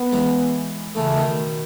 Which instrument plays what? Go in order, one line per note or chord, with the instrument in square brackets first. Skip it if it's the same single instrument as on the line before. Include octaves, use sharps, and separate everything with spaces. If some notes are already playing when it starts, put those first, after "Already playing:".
Already playing: [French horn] B3
[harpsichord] E3 G#3
[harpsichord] C#3 E3 [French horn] A3
[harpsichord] B2 D#3